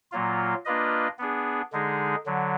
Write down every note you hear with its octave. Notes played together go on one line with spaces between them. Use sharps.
A#2 F#3 A#3 F4
A#3 D4 F4 B4 D#5
B3 D4 G#4
D3 G#3 D#4 G#4
D3 F#3